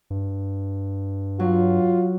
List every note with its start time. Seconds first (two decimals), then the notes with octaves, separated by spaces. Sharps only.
0.10 G2
1.40 F#3 F4